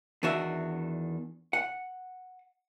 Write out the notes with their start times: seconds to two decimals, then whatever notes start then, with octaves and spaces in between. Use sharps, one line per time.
0.23 E2 D#3 D4 F#4 E5
1.53 F#5